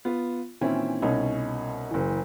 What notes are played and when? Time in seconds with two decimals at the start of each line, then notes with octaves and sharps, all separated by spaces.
0.05 B3 F4
0.61 A#2 D#3 E3 C4 C#4 E4
1.02 C2 B2 C#4 D#4 C#5
1.91 F#1 E3